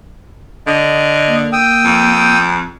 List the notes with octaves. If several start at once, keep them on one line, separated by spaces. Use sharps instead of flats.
D3 D#5
A#3
G5 D#6 E6
F2